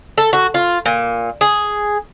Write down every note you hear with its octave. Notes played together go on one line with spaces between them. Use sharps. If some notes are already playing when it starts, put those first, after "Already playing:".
A4
F#4
F4
A#2
G#4